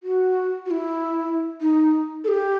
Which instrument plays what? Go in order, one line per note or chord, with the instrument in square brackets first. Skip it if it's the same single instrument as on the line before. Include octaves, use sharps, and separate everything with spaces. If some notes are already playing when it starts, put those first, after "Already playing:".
[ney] F#4
F#4
E4
D#4
A4
G4